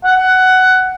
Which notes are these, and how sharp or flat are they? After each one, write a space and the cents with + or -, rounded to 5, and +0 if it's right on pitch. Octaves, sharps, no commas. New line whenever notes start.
F#5 +10